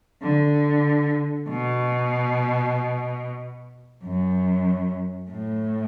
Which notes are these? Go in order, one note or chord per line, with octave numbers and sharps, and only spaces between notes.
D3
B2
F#2
A2